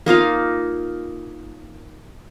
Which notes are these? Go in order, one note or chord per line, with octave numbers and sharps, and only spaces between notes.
A#3 D#4 F4 F5